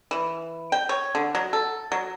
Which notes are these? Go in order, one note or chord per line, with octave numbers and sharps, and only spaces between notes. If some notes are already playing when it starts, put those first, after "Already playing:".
E3
G5
C#5
D3
F#3
A4
F#3